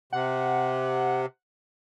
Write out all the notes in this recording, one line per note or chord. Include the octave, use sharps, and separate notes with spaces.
C3 F#5